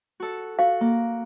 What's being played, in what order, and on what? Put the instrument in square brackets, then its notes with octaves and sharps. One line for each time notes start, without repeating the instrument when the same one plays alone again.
[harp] F#4 A4
[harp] F#4 [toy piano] F5
[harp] A#3